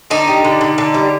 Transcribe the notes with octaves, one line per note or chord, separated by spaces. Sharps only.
D3 D#4
G3
D3
D3
D3
G3